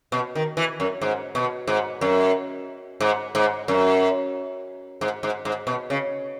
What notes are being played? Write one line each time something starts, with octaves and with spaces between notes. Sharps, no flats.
B2
D#3
E3
F#2
G#2
B2
G#2
F#2
G#2
G#2
F#2
G#2
G#2
G#2
B2
C#3